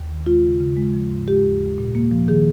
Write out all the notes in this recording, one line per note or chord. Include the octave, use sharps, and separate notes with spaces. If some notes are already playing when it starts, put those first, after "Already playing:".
Already playing: D#2
D#3
G#3 F4
C#3
C#3
G#3
F3
G#2
G#3 G4
D#2
G#3
A#2
A#3
F3
D#3 G#4